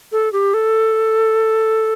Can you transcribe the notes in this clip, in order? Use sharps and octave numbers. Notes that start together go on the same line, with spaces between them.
A4
G4
A4